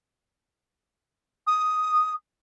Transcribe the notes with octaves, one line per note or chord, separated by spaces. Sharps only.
D#6